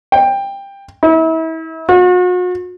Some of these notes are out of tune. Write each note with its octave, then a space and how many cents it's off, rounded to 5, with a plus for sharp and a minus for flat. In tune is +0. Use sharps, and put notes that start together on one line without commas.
G5 +15
E4 -35
F#4 -40